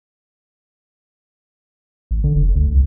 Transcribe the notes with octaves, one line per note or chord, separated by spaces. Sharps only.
A1
D3
F1
D2
C2